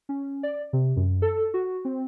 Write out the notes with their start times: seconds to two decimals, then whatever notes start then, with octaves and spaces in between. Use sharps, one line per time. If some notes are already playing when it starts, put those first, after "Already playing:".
0.09 C#4
0.43 D5
0.73 C3
0.96 F#2
1.22 A4
1.54 F#4
1.85 C4